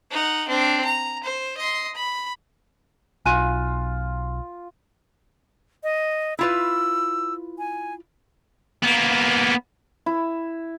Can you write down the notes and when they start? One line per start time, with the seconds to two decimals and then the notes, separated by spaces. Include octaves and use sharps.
0.11 D#4 F#5
0.48 C4 D4
0.85 A#5
1.24 C5
1.57 D#5 C6
1.95 B5
3.26 B1 F4 G#5 F#6 D#7
5.84 D#5
6.39 E4 F4 B4 E6
7.58 G#5
8.82 A#3 B3
10.06 E4